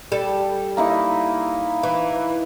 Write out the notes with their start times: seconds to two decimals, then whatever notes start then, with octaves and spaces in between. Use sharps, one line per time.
0.12 G3 A4
0.77 A#3 D#4 E4
1.83 E3